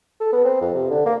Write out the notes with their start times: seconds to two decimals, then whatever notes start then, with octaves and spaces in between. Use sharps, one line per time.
0.20 A4
0.33 B3
0.45 C4
0.61 F2
0.75 C3
0.91 D3
1.06 A#3